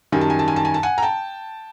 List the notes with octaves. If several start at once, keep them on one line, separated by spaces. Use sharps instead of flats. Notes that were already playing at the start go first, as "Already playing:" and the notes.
F#2 D#3 G3 G#5
A5
G#5
A5
G#5
A5
G#5
A5
F#5 G#5
A#5
G5 A5